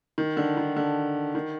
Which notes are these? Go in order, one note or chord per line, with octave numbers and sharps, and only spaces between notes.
D#3
D3
D#3
D3
D#3